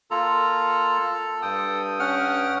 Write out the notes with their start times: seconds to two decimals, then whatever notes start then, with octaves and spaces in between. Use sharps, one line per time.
0.11 A#3 F4 A4 A#5
1.42 G2 G5 D#6
1.99 C#4 F#5 F6